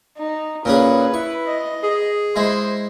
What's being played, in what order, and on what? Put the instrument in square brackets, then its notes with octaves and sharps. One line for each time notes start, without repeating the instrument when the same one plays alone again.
[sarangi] D#4
[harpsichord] A#2 C#4 G#4 [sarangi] B4
[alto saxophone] E4 [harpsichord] C#6
[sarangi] D#5
[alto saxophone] G#4
[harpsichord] G#3 E4 [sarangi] C5